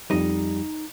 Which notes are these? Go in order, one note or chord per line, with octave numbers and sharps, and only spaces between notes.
F2 G3 D#4